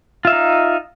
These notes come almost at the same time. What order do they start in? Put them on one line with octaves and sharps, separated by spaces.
F4 E5 F5 D#4